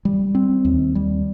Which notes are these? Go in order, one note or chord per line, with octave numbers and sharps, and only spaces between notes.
G3
C4
D#2
G3